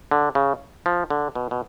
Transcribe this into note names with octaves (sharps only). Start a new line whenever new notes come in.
D3
C#3
F3
D3
B2
B2